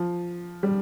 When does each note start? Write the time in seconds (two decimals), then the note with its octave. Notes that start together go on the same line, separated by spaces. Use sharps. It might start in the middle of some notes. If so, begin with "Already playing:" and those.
Already playing: F3
0.63 G3